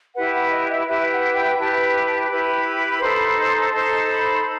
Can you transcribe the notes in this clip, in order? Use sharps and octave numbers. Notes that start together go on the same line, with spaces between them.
E4 G4 B4 F#5
F#5
D#5
E5
E4 G4 B4 E5
F#5
G5
E4 G4 B4 A5
A5
E4 G4 B4 B5
D#4 A4 C5
D#4 A4 C5 C6
B5